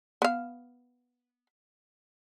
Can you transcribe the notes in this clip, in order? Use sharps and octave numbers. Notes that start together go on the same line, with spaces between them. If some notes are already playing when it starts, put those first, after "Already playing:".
B3 F5